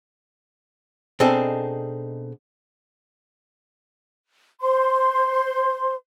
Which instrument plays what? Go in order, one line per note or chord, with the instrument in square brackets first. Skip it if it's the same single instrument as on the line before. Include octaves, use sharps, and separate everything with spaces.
[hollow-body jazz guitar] B2 C4 D4 D#4 G#4 A4
[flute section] C5 C6